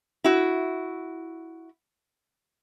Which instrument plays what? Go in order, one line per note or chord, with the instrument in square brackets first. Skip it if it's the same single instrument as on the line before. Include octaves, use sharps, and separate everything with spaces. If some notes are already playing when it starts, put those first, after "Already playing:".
[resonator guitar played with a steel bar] E4 F#4